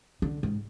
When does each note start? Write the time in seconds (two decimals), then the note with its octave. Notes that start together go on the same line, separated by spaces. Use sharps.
0.22 D3
0.43 G#2